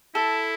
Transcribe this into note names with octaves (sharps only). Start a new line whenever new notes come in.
E4 A4